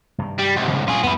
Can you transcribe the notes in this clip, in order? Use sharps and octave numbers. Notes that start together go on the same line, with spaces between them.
G2 C3 D#3
G3
C2 G#2
D1 C#3 G#3
A#2 G3 F4 G#4
F2 G3 A3 B3 E4